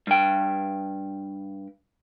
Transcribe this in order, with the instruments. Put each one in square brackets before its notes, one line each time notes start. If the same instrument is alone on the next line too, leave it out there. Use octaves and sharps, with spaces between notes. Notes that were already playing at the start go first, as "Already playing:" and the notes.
[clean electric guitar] G2 G5